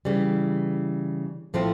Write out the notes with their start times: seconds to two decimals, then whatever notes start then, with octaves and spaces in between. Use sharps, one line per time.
0.05 C#3 E3 G3
1.54 A2 F3 A3 C4